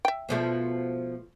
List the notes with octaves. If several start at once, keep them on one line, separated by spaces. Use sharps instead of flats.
E5 G5
B2 F3 A3